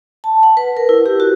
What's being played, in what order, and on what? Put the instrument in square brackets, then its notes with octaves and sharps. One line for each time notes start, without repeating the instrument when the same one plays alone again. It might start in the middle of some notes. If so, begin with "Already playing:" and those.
[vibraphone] A5
F#5
B4
A#4
E4
G4
F#4